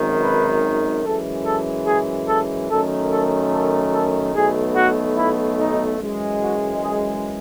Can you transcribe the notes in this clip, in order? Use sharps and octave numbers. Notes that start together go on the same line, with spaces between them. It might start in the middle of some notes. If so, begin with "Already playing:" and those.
Already playing: G#1 F#2 D#3
B4
F#2 E3 G#3 A4
A4
G#4
A4
F#2 D#3 A3 A4
A4
A4
A4
B1 B2 A3 G#4
F#4
E4
D#4
F#2 E3 G#3
F#4
G#4